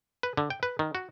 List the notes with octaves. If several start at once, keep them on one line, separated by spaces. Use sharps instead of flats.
B4
D3
G5
B4
D#3
F#4